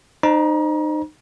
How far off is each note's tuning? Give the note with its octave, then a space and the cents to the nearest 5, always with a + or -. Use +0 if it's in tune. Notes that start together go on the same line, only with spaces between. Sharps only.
D#4 -30 C5 +0 A#5 +35